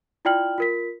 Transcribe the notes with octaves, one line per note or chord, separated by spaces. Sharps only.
E4 F4 D5 G5 F6 F#7
F4 A#4 B6